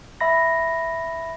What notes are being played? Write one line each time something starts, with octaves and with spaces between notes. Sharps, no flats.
E5 B5 A#6